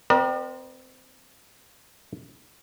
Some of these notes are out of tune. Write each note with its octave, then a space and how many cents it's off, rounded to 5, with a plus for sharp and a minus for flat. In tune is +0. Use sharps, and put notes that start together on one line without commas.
C4 -15 A#4 +40 D5 +45